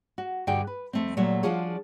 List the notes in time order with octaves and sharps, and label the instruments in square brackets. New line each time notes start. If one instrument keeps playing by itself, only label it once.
[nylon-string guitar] F#4
G2 D3 G3 F#4 G#4 G5
B4
F2 A3 C4
A#2 F#3 G3 A3 F#4
F3 D4 F4 F#4 G#4 C#5